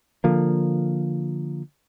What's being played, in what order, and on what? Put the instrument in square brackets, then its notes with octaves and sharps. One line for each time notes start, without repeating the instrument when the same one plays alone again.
[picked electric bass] D3 F3 A#3